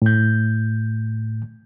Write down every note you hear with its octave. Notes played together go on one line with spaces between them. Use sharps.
A2 G6